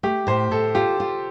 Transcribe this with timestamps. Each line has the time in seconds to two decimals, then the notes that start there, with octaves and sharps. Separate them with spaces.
0.03 A3 G4
0.27 A2 C5
0.51 A2 A4
0.75 F4 G4
1.00 F4